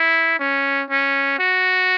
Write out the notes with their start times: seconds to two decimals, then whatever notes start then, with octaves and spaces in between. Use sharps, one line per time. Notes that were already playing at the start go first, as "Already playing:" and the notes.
Already playing: E4
0.39 C#4
0.90 C#4
1.39 F#4